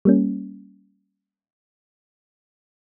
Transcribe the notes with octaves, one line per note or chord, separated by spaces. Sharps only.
G3 A#3 C#4